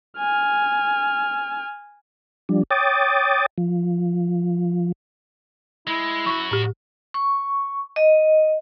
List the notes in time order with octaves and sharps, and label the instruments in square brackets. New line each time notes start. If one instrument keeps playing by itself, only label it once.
[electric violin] G#5 F6
[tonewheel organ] F3 G3 D4
C#5 G5 D6 D#6 A6
F3
[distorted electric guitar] G#3 [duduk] E4
[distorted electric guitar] F#2 F#4 [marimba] C#6
[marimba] A2 G4
[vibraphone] C#6
D#5